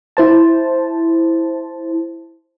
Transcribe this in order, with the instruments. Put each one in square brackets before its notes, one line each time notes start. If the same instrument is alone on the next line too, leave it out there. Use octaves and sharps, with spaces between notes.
[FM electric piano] E4 C5 A5